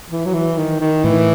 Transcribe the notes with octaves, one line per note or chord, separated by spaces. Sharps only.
E3
F#3
E3
D#3
D#3
A2 E3